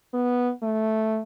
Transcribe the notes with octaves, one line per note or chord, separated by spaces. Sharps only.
B3
A3